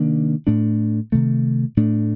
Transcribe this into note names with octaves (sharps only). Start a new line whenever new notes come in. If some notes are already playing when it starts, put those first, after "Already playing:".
Already playing: C3 D#3 A#3 D4
A2 A3 D4
C3 D#3 A3
A2 A3 D4